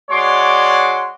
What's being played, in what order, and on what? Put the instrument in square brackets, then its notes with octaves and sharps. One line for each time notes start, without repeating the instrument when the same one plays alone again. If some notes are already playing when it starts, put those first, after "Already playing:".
[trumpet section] G#3 F#4 C#5 D5 C6 D6